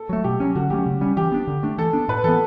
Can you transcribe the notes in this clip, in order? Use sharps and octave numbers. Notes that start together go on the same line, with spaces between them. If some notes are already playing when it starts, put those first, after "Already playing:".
Already playing: A4
F#3 A3
B2 G4
F#3 C#4
D3 F#4
F#3 A3 C#4 G4
C#3
G3 C#4
E3 G4
B3 D4
D3
A3 D4
E3 A4
B3 D4
A2 B4
E3 B3 A4